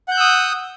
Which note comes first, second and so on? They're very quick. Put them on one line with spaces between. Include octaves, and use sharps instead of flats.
F#5 G6 F#6 E6 D#6